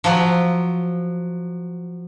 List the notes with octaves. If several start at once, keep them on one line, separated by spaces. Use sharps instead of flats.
F3 F#3